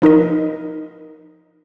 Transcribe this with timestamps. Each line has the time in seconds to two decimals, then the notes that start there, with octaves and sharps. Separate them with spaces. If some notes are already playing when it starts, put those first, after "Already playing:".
0.02 F3 D#4 A#4 D#5